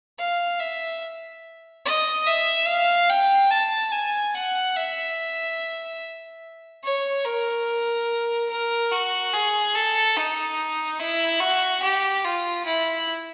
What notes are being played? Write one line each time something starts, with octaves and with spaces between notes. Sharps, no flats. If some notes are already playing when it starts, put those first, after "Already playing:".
F5
E5
D#5
E5
F5
G5
A5
G#5
F#5
E5
C#5
A#4
A#4
F#4
G#4
A4
D#4
E4
F#4
G4
F4
E4